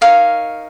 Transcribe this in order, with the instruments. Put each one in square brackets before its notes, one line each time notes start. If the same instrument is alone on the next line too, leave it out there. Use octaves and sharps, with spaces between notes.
[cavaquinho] D#4 A#4 C#5 F5